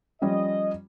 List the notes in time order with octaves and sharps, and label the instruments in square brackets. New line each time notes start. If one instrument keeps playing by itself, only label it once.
[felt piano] F3 G3 C#4 [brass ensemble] D#5